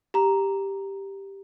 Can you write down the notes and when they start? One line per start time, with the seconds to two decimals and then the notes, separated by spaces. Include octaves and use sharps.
0.14 G4 A#5